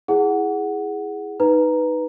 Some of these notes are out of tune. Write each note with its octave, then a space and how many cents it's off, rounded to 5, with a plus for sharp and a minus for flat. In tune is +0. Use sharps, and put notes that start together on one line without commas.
E4 +0 G#4 +0 F#5 +0
D#4 +0 B4 +0 A#5 +0